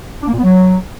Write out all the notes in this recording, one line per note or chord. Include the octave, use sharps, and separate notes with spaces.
D4
A#3
A#2
B3
F#3